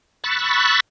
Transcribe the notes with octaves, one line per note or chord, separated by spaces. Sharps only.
B5 C#6 E6 F#6 A6